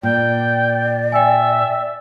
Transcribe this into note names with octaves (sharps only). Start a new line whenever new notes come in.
A#2 D5 G5
E5 G5 G#5